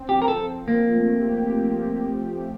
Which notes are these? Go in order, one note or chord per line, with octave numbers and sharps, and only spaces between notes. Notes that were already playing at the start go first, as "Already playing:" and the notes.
Already playing: C4
G4
F3
A#4
A4
C4
F3 A#3
A3
G4
G4
F3